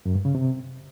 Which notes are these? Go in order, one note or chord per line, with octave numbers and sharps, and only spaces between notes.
F#2
G2
C#3
C3